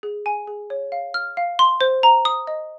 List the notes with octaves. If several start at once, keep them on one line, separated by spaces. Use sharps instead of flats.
G#4
G#5
G#4
C#5
F5
F6
F5
C6
C5
A#5
D#6
D#5